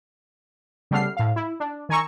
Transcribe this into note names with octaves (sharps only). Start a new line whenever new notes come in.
C#3 G3 A3 B3 F6 C7
A2 F5
E4
D4
D#3 G#5 A#5 C#6 E6